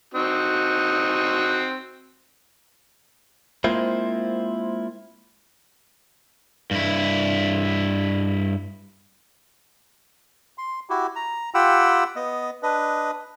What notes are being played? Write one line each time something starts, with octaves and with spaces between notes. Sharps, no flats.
C4 D#4 F#4
G#3 A#3 C4 E4 F4 C5
G2 E4
C6
E4 F#4 G4
A#5
F4 G4 F#5 G5 B5 E6
B3 D#5
D4 B4 D#5